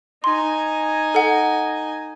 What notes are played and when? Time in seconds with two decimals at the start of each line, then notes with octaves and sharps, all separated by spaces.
0.24 D#4 G#5 C6
1.15 A4 F#5